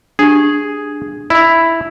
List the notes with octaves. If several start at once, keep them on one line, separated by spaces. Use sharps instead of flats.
D4 G4 G#4
E4 D#5 B5